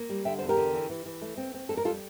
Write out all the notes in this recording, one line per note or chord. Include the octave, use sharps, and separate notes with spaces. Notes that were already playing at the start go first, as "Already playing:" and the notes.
Already playing: A#3
G3
D3 E5 G5
E2 C5
G4 A#4
D3
E3
E3
E3
A3
C4
C4
F2 A4
A#4
G3 F4 A4